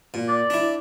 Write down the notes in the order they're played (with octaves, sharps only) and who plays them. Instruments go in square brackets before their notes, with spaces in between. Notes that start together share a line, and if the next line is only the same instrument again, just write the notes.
[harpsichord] A#2
[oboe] D5
[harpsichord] D4 E4